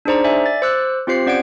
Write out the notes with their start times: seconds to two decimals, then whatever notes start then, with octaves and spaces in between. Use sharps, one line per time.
0.05 D4 D#4 G#4 C5 D5 A#5
0.24 D5 E5 G#5
0.46 A6
0.62 C5 D6 E6 F#6
1.07 C4 F4 G4 C5 C7
1.26 C#4 D5 F#5 G#6 D7